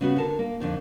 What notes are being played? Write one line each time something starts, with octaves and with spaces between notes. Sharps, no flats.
C#3 B3 F#4
D3 A4 A#4 A5
A#3
F2 D3 D#3